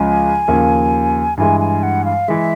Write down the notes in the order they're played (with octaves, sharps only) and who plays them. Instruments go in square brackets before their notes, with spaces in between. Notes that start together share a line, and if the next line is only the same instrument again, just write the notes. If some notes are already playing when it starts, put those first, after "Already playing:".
Already playing: [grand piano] C#2 C#3 F3 G#3 [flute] G#5
[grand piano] D#2 C#3 F3 A#3
[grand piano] G2 E3 G#3 [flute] G#5
[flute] G#5
F#5
F5
[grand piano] E3 G#3 [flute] E5